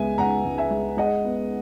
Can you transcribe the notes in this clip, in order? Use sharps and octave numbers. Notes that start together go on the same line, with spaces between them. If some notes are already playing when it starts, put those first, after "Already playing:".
Already playing: C#2 G#3 B3 E5 G#5
C#2 F#5 A#5
C#2
E5 G#5
G#3
G#3 D#5 F#5
B3